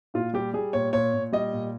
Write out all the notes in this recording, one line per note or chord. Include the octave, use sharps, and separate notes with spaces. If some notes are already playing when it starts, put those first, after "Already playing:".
A#2 F4
G3 G4
G3 G#4
A#2 C#5
A#2 C#5
A#2
G3 D#5
A#2